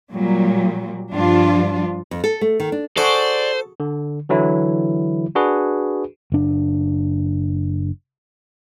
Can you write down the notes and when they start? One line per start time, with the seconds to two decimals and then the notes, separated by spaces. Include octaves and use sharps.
0.12 A#2 F#3 G3
1.13 G2 F3 D4 F4
2.11 F2
2.24 A4
2.41 A3
2.60 D#3
2.72 D4
2.97 F#4 G#4 A4 C5 D5
3.80 D3
4.29 D3 E3 F#3 E4
5.35 D4 F#4 G#4 B4
6.32 F#1 D4